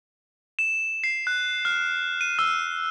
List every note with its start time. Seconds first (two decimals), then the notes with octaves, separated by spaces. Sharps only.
0.59 E7
1.04 C7
1.27 F#6
1.65 F6
2.21 D#7
2.39 E6